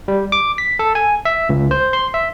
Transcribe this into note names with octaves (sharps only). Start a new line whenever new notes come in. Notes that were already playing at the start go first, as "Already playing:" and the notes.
G3
D6
B6
A4
G#5
E5
C#2
C5
C6
E5